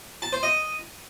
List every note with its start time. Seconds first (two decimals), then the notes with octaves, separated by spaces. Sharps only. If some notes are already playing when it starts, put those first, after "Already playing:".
0.22 A5
0.33 C5
0.43 D#5